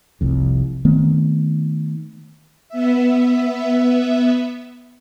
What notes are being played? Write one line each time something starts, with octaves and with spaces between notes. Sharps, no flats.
F1 C2 F2
D#3 A3 B3 C4
B3 E5